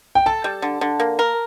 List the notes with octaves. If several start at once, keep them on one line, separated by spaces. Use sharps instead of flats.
G5
A4 A5
G3
D3
D3
A#3
A#4